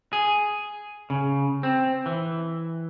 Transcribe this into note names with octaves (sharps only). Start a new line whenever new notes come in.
G#4
C#3
C4
E3